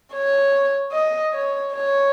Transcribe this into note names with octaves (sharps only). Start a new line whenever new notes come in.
C#5
D#5
C#5
C#5